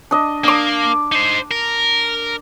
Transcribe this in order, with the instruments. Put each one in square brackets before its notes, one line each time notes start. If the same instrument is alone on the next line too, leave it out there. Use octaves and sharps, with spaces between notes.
[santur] D4 D#5
[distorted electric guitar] A#3 [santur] D4 D6
[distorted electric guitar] D#4 C5
A#4